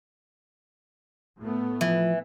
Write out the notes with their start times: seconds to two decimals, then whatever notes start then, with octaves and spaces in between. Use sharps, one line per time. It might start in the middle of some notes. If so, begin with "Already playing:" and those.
1.40 A2 A3 B3
1.81 E3 F3